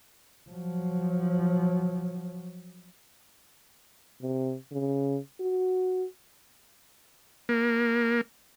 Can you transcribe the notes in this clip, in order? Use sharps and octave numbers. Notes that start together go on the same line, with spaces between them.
F3 F#3
C3
C#3
F#4
A#3